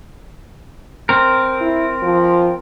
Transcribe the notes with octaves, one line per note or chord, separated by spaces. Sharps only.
C4 A#4
E4
F3